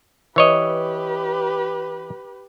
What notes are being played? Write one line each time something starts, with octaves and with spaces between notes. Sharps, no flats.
E3 G4 B4 C#5 D#5